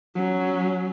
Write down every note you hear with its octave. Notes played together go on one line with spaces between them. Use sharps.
F#3 C#4